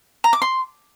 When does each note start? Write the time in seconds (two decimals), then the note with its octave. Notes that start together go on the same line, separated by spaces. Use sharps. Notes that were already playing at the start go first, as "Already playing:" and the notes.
0.24 A#5
0.33 D6
0.42 C6